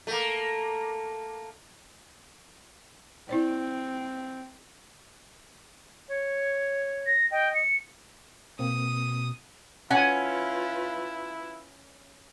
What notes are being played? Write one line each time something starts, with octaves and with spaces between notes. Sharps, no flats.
A3 A#3
C4 E4 C5 D5
C#5
A#6
D#5 G5
C#7
B2 A#3 C4 D#6
C#4 E4 F4 B4 F#5 G#5